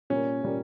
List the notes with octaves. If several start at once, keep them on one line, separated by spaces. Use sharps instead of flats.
A#2 G3 A#3 C#4
A#2 G3 A#3